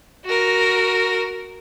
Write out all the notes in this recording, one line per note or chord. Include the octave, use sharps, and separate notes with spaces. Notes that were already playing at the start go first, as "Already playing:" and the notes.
F#4 A#4